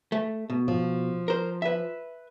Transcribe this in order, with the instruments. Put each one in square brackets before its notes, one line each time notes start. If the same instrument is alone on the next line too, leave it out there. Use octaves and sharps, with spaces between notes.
[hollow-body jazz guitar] A3
B2
[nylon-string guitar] F3
[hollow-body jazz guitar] A#4 C5
B4 E5